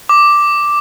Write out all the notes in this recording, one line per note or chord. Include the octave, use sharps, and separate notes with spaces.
D6